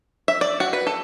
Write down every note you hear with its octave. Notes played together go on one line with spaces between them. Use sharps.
E5
D5
F#4
B4
A4